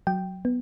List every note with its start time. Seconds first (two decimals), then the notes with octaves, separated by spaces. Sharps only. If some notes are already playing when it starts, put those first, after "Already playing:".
0.07 F#3 G5
0.45 B3